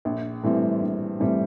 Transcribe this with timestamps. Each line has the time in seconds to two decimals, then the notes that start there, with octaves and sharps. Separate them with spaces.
0.05 A#1
0.43 A2 E3 G3 C4
0.81 A#1
1.20 A2 E3 G3 C4